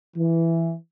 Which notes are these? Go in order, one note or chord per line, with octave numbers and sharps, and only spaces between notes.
E3